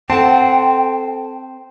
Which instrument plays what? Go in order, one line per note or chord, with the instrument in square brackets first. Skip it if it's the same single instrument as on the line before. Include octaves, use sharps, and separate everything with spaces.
[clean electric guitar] C4 [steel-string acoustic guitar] A4 F#5 A5 [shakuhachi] G5